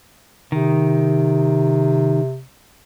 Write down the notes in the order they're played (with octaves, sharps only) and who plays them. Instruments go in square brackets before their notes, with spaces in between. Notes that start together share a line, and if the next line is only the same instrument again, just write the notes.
[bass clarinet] C3 [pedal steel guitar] D#3